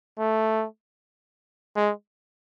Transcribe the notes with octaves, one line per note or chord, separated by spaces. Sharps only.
A3
G#3